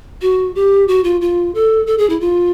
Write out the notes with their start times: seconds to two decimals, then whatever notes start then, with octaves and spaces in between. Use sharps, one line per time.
0.22 F#4
0.55 G4
0.88 F#4
1.04 F4
1.21 F4
1.55 A4
1.87 A4
1.98 G#4
2.10 E4
2.20 F4